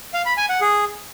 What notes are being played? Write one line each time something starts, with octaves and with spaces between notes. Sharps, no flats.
F5
B5
G#5
F#5
G#4